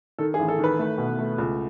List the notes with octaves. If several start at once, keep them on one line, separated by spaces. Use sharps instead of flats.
D#3 A4
G#4
A1
A4
D#3
B4
A3
B2
A3
C#2